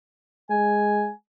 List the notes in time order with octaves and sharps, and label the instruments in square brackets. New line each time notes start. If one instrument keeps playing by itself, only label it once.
[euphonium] G#3 [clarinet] G#5